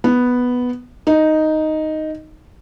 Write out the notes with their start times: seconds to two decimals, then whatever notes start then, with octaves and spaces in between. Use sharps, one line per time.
0.04 B3
1.07 D#4